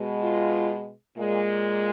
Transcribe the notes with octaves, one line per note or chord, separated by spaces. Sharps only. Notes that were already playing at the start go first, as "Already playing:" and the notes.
Already playing: B2 G#3
F4
A#2 G#3